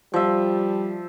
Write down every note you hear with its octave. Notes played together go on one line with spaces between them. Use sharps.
F3 G3 E5